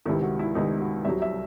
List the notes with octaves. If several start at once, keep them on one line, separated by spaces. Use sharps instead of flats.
C#2 C3 D#3 E4
F#4
E4
C#2 C3 D#3 D#4
F#4
C2 C3 F#3 E5
E5